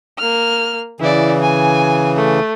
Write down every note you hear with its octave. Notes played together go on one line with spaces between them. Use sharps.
A#3 F6
C#3 E3 E4 D5
G#5
A3